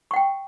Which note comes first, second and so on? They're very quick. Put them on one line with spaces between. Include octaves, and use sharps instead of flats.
C#6 F#5 G5